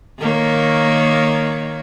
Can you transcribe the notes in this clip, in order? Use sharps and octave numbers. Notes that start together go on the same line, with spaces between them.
D#3 A#3 C#5